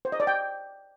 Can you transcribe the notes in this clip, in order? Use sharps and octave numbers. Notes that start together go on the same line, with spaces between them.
C5
D#5
D5
G5